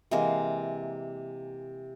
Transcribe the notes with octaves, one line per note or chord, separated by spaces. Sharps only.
C3 E3 G#3 A#3